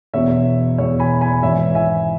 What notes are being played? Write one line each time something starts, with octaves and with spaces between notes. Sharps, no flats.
E1 E2 B2 C#5 E5
E1 E2 B2 C#5
G#5 B5
G#5 B5
G#1 G#2 E3 C#5 E5
E5 G#5